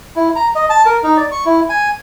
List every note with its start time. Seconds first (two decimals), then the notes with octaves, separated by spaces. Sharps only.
0.16 E4
0.35 A#5
0.55 D#5
0.70 A5
0.86 A#4
1.03 D#4
1.17 D5
1.32 C#6
1.46 E4
1.70 G#5